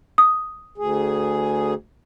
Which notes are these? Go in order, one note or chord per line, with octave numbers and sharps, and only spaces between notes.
D#6
D2 G#4